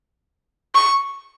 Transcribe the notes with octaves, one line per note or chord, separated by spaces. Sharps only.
C#6